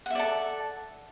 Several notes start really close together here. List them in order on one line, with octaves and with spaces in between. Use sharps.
F#5 E5 D5 A4